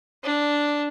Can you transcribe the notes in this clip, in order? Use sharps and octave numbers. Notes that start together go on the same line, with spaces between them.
D4